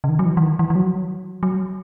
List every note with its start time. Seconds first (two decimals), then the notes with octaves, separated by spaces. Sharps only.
0.04 C#3
0.09 D#3
0.19 F#3
0.25 E3
0.37 E3
0.43 D#3
0.59 E3
0.70 E3
0.75 F#3
1.43 F#3